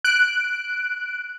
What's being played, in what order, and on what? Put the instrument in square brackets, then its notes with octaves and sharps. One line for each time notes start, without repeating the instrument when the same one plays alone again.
[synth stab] F#6 D7